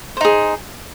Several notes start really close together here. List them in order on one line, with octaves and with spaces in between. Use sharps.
C5 D#4 G#4